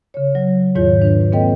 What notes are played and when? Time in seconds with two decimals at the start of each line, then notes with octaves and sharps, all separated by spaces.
0.14 C#3 C#5
0.35 F#3
0.75 E2 G#2 D#3 F4 C#5 G6
1.02 D4 B4
1.32 A#3 C4 A4 B4 D#5 G5